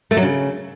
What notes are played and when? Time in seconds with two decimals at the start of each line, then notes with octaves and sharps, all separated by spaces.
0.11 A3
0.17 F#3
0.23 C#3